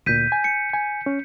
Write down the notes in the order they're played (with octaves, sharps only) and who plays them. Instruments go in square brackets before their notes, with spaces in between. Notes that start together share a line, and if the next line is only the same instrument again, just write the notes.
[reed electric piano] D2 A#2 [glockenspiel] G6 B6 D#7
[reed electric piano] G#5
[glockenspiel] C#7
[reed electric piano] G#5
C#4